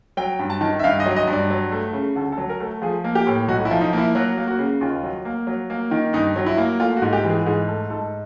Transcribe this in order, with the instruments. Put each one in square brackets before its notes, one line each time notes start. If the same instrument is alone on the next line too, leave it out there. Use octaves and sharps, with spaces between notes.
[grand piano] F#3 G5
G2
A5
D#3
E5
G2 F5
D#5
F#3
D#5
G2
D5
F#3
A3
C#3
D2 A4
A4
F#3
A#4
A3
A4
F3 G#4
A#3
G4
A2
B1 F#4
E4
F3
D#4
A#3 E4
F#3 F#4
A#3
F#4
C#3
D#2 F4
F#3
A#3
F#3
A#3
D#3
G2 D#4
F#3
E4
A#3
A3 F4
F#4
G#2
G4
E3
G#4
G#2 G#4
A3 A4
G#2 A4